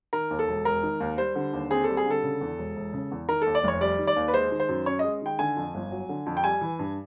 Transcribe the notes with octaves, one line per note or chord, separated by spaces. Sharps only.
D#3 A#4
D#2
A4
E1
E1 A#4
D#3
D#2
G3 C5
D3
D#2
C4 G#4
G3 A4
G#4
D3 A4
C#3
E2
E1
E1
C#3
E2
D#3 A#4
D#2 A4
D5
F1 C#5
G3 D5
D#3
D5
D#2
B4
G#3 C5
D#3
C5
F#2
C#4 C#5
G#3 D#5
D#3 G5
D3 G#5
F2
G1
F#3
D3
F2
G5
G3 G#5
E3
G2